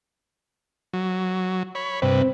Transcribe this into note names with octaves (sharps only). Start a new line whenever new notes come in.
F#3
C#5 B5
G2 C3 C4 B4